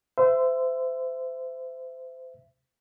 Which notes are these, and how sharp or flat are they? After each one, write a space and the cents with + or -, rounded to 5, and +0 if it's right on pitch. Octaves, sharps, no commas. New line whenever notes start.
C5 -30 E5 +15